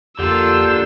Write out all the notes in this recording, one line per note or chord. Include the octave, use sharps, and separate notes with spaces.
F2 D3 A#3 D4 F4 G4 E6 G6